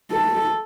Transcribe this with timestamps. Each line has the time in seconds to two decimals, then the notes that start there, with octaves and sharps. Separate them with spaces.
0.12 A4